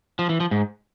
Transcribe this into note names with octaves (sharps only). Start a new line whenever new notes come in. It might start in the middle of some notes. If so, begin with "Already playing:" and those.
F3
E3
F3
G#2